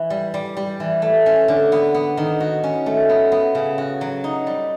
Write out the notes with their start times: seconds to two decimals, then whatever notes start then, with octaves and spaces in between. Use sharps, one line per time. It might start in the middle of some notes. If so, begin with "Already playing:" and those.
Already playing: E3
0.10 G3
0.34 G3
0.57 G3
0.80 E3
1.02 A3
1.26 C#4
1.48 D3
1.72 B3
1.94 B3
2.17 D#3
2.40 F#4
2.64 C#4
2.86 A3
3.09 B3
3.32 B3
3.55 C#3
3.78 F#4
4.01 F#3
4.24 D#4
4.47 G3